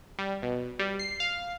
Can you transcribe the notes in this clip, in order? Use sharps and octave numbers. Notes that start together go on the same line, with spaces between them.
G3
B2
G3
C7
F5